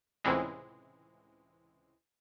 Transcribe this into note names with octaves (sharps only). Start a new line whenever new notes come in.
C#2 A2 C3 E3 G#3